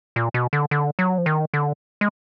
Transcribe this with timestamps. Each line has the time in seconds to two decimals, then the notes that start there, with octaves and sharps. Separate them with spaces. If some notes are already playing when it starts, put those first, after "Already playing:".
0.16 A#2
0.34 B2
0.53 D3
0.71 D3
0.99 F#3
1.18 F3
1.26 D#3
1.54 D3
2.01 G#3